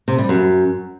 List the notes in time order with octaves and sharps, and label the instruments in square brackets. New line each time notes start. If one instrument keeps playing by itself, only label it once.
[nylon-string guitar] C3
G3
F#2